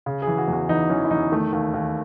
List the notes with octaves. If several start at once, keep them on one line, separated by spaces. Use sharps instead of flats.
C#3
G#4
E3
F#4
E2
F#4
E3 D#4
E3 C#4
E4
E2 D#4
D#3 A3
D#2
D#2